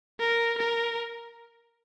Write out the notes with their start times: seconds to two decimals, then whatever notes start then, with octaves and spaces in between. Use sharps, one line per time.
0.20 A#4
0.58 A#4